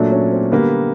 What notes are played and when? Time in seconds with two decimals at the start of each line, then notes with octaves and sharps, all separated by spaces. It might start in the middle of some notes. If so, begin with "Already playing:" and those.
Already playing: A#2 F#3 A3 D4
0.12 C#4
0.32 C4
0.51 D3 G3 A#3 B3